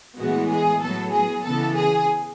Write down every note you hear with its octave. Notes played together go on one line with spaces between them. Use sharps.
A2 E3 G#3 B3 F#4
G#4
A2 F#3 B3 A4
G#4
C#3 E3 B3 A4
G#4